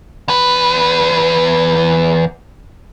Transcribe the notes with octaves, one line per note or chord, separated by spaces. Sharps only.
E2 B4